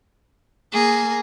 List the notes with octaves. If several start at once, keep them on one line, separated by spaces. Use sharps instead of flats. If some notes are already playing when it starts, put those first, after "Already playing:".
A#3 G#4